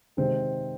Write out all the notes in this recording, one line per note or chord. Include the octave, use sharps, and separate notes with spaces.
C3 D#3 G#3 C4